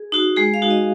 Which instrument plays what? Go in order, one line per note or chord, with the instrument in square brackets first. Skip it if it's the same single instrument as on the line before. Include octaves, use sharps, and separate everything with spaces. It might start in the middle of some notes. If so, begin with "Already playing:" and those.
Already playing: [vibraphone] G#4
D#4 F#4
G#3 G#4
F5
D#4 F#4
D#5